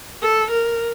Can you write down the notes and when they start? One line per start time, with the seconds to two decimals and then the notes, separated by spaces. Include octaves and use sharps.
0.22 A4
0.50 A#4